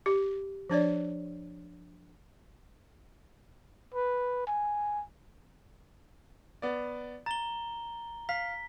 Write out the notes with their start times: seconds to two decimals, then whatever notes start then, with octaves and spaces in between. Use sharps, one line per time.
0.06 G4
0.70 F3 D4 C#5 D5
3.94 B4
4.47 G#5
6.62 B3 D5
7.26 A#5 A6 G7
8.29 F5 B6